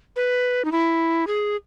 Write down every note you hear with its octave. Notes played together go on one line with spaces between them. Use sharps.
B4
D#4
E4
G#4